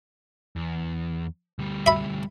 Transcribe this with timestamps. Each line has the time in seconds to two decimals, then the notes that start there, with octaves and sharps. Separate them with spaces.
0.56 E2
1.59 D2 G3
1.86 E5 B5